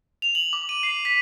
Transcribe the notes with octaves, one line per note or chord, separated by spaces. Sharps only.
F7
F#7
D6
D#7
C7
B6